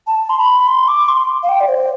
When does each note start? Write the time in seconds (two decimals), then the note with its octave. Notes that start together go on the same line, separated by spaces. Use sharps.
0.07 A5
0.29 C6
0.38 B5
0.68 C6
0.88 D6
1.09 C6
1.43 F5
1.49 G5
1.60 D5
1.68 C5